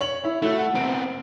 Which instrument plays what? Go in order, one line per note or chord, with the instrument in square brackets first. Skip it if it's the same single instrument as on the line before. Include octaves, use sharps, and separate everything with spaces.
[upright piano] C#5 F#7
E4 C#5
[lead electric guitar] A3 [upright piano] E4 F#4
[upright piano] F#5
[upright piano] F#1 D7 [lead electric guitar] B3 C4